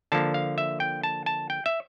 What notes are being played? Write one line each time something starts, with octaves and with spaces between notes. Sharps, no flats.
D3 F3 A#3 A5
F5
E5
G5
A5
A5
G5
E5